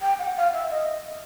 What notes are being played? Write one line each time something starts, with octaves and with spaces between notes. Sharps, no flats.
G5
F#5
F5
E5
D#5